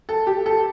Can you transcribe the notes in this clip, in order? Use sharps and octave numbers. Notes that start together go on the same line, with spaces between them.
A4
G4
A4